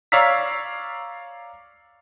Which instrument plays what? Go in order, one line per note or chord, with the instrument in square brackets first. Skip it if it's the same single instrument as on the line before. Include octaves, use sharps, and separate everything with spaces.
[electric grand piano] C#5 D5 F5 A#5 E6 B6